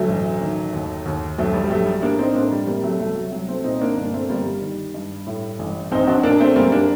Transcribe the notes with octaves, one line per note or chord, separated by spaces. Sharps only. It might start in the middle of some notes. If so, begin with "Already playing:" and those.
Already playing: D2 F#3 A3
A1
D#3
D#2
D#2
A#1 F#3 A3
G3
G3
A#1 F#3 A3
G3
A2 A#3 D4
C4 D#4
A2 A#3 D4
G3
C3 G3 A#3
F#3 A3
C2 F#3 A3
F#3
C2 F#3
A3 C4
A#2 C4 D#4
A#3 D4
G1 A#3 D4
A3 C4
G1 G3 A#3
G3
D#3
G2
A2
A1
A#1 C4 D#4
D4 F#4
A#2 A#3 D4
A3 C4
F#1 G3 A#3
A#3 D4